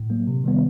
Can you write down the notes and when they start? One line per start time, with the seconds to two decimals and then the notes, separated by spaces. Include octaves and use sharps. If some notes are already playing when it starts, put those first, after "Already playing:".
Already playing: A2
0.10 F#3 A#3
0.27 C3
0.44 D#3 G3 B3